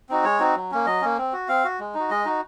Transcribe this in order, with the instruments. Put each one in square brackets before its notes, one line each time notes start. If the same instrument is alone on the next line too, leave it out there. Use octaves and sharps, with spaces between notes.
[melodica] C4 D#4 F#4
G#3 C#5
C4 D#4 F#4
F#3
A#3 C#4
F#3 D#5
A#3 C#4
C4
F#4
C4 F5
F#4
G#3
D#4
F#4
G#3 D#5
D#4 F#4